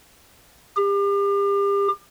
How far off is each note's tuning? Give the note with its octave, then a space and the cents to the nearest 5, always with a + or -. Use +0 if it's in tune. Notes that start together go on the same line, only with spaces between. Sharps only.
G4 +35